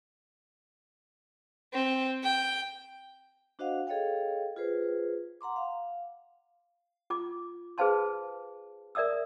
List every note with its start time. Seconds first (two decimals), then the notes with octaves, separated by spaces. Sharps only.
1.73 C4
2.23 G5
3.59 D4 F#4 C5 D#5 F5 F#5
3.87 G#4 A4 C#5 D#5 F5 G5
4.56 F4 G#4 B4 C5
5.41 F#5 A#5 C6 D6
5.56 F5
7.10 F4 D6
7.78 G#4 B4 C5 F5 A5 C6
8.95 A#4 D5 E5 D#6 E6